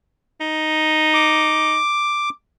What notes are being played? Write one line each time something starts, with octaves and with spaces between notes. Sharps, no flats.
D#4
D6